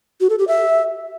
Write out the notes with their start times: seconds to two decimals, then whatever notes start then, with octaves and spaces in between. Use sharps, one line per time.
0.21 F#4
0.30 A4
0.39 G4
0.48 E5